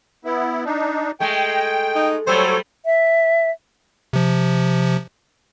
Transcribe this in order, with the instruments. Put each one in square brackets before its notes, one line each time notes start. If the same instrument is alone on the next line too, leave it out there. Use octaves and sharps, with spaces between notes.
[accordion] B3 E4
D4 D#4
[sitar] G#3 A3 [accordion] G5
[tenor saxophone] D#4
[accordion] F#3 A4 C#5 [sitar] G3 A3 [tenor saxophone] C5
[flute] E5
[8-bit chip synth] C3 F3